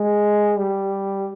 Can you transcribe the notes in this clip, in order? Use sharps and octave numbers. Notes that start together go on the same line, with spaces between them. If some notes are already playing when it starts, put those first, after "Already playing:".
Already playing: G#3
G3